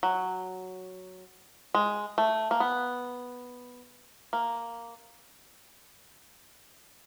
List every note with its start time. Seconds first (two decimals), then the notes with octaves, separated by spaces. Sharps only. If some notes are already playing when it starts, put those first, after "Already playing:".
0.03 F#3
1.74 G#3
2.18 A3
2.51 A#3
2.60 B3
4.33 A#3